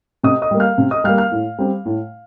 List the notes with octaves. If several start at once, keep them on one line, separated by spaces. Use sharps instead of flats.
C3 D#5 D#6
D#5 D#6
G3 A#3
F5 F6
C3
D#5 D#6
G3 A#3 F5 F6
F5 F6
A2
G3 C4
A2